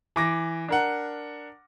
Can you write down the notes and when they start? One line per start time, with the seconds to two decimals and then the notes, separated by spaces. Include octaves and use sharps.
0.16 E3 D6 A#6
0.68 D4 A#4 F#5